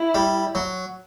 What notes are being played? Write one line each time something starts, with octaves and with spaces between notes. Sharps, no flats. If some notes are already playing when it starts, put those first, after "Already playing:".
Already playing: E4
G3
F#3